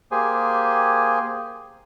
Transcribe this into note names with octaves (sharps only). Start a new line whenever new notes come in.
A#3 G4 G#4 C5 G#5